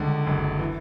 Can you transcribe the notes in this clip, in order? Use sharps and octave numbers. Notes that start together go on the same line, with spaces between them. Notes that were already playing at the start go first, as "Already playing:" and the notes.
Already playing: C#2 D3
F#1
E3